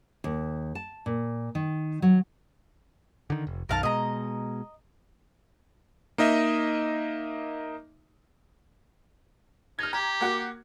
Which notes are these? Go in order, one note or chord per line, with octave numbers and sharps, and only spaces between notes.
D#2
A5
A#2
D#3
F#3
D3 D#3
F1
B1 F#2 D#3 A#4 F5 A5
B2 G#3 D#5 A#5
A#3 D#4 D#5 E5
D#4 F6 G#6
G4 A#5
A#3 F#4 D6